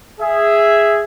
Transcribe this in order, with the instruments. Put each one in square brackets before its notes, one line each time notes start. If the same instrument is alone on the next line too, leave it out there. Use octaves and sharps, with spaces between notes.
[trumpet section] G#4 E5